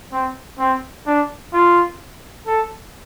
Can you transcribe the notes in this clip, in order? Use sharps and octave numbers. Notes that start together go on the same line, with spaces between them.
C4
C4
D4
F4
A4